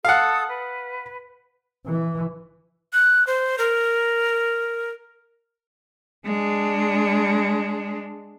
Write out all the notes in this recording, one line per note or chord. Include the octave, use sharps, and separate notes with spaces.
A4 F5 F#5 D#6
B4
E3
F#6
C5
A#4
G#3 D4